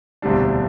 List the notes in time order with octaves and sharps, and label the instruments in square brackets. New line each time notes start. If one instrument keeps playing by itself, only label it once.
[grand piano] E1 D2 C3 G3 D4